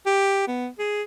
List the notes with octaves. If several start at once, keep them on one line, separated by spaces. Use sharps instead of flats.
G4
B3
G#4